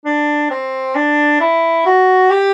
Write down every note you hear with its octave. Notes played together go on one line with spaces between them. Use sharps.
D4
C4
D4
E4
F#4
G4